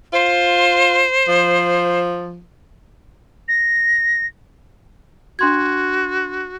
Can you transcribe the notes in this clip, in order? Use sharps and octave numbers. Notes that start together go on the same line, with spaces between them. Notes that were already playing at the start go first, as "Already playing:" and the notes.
F4 C5
F3
A#6
D4 F#4 C6 G#6